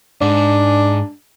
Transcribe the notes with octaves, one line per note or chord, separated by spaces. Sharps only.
G#2 D4